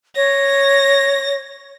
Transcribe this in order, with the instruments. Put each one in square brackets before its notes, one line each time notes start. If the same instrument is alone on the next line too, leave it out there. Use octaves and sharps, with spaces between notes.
[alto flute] C#5 [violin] A#6